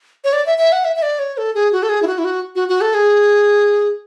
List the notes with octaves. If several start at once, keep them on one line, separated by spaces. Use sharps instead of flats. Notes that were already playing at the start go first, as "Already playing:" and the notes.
C#5
D5
E5
E5
F#5
E5
E5
D5
C#5
A4
G#4
F#4
A4
G#4
E4
F#4
E4
F#4
F#4
F#4
A4
G#4